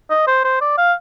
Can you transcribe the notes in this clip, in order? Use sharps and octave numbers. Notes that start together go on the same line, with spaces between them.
D#5
C5
C5
D5
F5